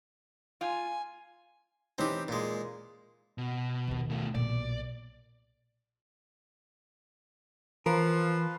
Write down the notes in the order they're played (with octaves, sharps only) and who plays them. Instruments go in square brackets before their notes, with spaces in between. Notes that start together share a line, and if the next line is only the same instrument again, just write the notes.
[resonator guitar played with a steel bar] F4 [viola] G#5
[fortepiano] E3 C#4 D#4 [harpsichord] C4 G4
[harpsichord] A#2 G#3
[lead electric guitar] B2
[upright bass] D#2 D#3
[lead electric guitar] B2 A3
[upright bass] B1 A#2 [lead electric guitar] D5
[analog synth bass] E3 [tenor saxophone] F3 [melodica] F4 B4 F5 [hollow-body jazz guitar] A#4